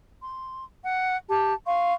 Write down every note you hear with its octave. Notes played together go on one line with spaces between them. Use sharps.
C6
F#5
G4 A5
F5 C6 C#6